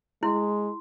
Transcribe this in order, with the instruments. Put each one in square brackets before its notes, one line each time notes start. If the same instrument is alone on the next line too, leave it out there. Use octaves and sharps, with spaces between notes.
[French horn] G#3 [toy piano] E4 [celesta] C6